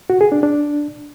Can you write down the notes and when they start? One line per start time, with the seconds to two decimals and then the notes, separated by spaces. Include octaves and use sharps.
0.10 F#4
0.21 G#4
0.32 D4
0.43 D4